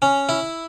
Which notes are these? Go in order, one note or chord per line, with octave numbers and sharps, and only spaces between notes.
C#4
E4